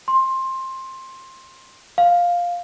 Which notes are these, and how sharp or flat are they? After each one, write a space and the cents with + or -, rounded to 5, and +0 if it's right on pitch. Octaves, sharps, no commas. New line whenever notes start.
C6 +15
F5 +5